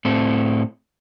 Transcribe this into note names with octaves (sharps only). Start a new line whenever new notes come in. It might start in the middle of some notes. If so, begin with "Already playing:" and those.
A2 C4 A4